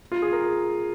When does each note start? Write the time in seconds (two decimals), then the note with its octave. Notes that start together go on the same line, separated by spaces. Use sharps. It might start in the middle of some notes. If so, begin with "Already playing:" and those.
0.12 F4
0.22 G#4
0.33 A#4
0.43 G#4